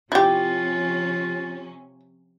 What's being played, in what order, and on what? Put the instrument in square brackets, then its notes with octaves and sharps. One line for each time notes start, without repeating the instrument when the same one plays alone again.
[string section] C3 F3 C#4 [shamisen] E4 G4 [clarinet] F4